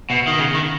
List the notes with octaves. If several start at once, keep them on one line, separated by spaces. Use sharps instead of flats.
B2
D#3
C#3
D#3